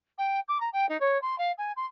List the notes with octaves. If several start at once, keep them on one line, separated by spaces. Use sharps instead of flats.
G5
D6
A#5
G5
D#4
C#5
C6
F5
G#5
C6